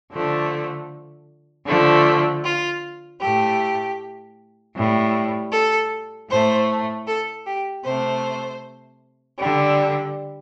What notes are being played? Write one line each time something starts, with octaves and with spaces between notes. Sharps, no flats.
D3 F3 A3
D3 F3 A3
F4
A2 A3 G4
A2 G3
A4
A2 A3 C5
A4
G4
C3 A3 C5
D3 G3